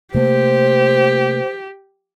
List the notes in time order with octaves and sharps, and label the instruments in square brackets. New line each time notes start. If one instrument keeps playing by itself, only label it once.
[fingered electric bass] C3 A3 A#3 [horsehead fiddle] G4 [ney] C5